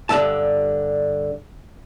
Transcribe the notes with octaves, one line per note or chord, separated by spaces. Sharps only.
G2 D3 F3 E5 A5